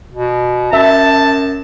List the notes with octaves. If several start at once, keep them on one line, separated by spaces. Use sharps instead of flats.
B2
F#2 E5 A5